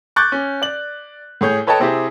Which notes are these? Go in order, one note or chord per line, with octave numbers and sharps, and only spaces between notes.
C#6 D6 F#6 G6 A6
C#4
D5 F#7
A2 G#4 C#5 G6
A4 B4 C#5 D#5 G5 A5
C3 C4 E4 G4 G#4